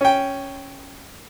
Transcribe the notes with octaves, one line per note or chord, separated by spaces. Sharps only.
C#4 G5